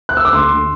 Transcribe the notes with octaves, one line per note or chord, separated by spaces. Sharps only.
F#6
E6
D6
D2 C6
D2